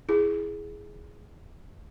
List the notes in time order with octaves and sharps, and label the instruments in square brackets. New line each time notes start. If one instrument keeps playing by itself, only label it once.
[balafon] E4 G#4